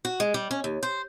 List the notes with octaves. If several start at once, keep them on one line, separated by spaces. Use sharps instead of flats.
F#4
G#3
G3
C#4
D#2
C5